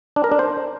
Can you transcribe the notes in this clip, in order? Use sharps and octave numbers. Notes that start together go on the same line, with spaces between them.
D4
A#4
D4
C5